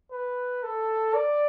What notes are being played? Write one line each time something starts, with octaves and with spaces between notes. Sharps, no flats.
B4
A4
D5